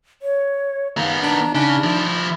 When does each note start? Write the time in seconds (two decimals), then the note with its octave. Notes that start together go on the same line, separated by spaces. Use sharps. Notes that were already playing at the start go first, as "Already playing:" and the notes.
0.22 C#5
0.97 D#3 B3 F5
1.23 D4 A#5
1.55 C#3 D4 D#4
1.84 F3 E4